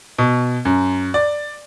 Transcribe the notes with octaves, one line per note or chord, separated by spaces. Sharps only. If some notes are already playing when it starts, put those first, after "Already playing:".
B2
F#2
D5